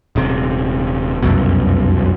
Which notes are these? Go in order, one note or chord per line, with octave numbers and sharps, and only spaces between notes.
D#1 C3
F1 C2 F#2 B2